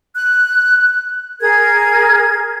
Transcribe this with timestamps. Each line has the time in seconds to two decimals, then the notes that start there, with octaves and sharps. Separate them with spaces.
0.15 F#6
1.41 G#4 A#4 G#6